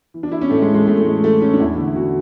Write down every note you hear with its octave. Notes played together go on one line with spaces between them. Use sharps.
E3
D4
E3 E4
C#4
A2 A3
G#3
E3
G#3
A2 A3
A3
E3 G#3
E3 A3
E3 C#4
D4
E2 E4
D3
D3 F#4